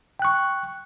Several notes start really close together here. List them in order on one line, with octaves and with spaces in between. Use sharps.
G5 F#6 C#6